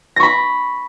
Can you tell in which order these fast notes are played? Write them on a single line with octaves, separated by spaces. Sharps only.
A#6 C#6 B5